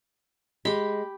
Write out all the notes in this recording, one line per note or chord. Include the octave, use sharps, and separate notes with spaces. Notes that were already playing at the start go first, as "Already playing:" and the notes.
G#3 G4 B5